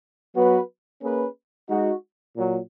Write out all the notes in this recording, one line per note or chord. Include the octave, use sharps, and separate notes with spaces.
F#3 B3 F#4 B4
A#3 C#4 G#4 B4
G#3 D#4 F#4
A#2 F#3